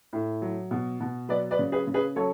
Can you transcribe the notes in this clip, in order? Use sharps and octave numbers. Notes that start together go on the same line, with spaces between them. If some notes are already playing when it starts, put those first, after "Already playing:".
A2
F#3
B2
B2
F#3 B4 D5
B4 D5
C#3
G#4 B4
C#3
G#4 B4
F#3 A4 C#5